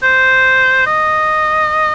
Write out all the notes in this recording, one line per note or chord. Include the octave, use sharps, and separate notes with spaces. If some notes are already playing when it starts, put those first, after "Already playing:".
C5
D#5